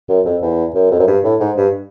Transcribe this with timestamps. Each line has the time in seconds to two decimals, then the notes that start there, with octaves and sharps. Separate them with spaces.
0.09 F#2
0.25 F2
0.42 E2
0.75 F#2
0.91 F2
0.99 F#2
1.07 G2
1.24 A2
1.40 G#2
1.57 G2